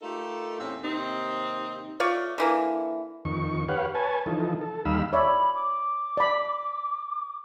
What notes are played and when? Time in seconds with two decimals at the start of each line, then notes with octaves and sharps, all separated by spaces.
0.02 A3 D#4 F4 G4 A4 A#4
0.60 E2 A2 C4 C#4 E5
0.83 D#2 C3 C4 D#4
2.00 A3 F4 C#5 D5
2.38 D3 E3 A#3
3.25 F2 D#3 C#6
3.68 G4 B4 C#5 F5 F#5
3.95 B4 C#5 G#5 A5
4.26 E3 F3 D#4 A4
4.61 A4
4.85 D#2 G3 D#4 F5 B5 E6
5.13 C#5 D5 E5 B5
5.54 D6
6.17 D5 B5